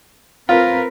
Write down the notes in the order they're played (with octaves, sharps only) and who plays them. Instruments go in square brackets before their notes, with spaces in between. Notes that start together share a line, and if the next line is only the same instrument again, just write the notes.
[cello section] C4 A#4 B4 [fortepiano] F4